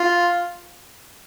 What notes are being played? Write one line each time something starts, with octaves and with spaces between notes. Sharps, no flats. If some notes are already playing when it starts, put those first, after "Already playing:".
Already playing: F4